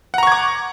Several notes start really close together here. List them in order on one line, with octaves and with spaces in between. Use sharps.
F#5 A#5 C#6 G#6 D6